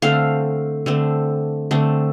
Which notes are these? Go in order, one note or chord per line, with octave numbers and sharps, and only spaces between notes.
D3 A3 C4 F5
D3 A3 C4
D3 A3 C4